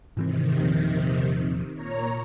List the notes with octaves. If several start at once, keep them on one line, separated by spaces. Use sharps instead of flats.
G#2 C3 D#3 E3 C4
E2 A#2 F3
A#2 C#5 A#5